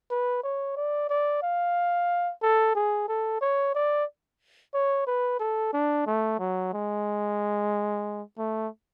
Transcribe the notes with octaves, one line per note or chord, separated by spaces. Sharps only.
B4
C#5
D5
D5
F5
A4
G#4
A4
C#5
D5
C#5
B4
A4
D4
A3
F#3
G#3
A3